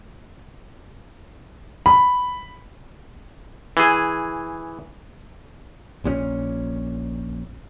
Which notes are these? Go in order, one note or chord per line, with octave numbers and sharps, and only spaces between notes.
B5
E3 G#4
A#1 A#2 D#3 C#4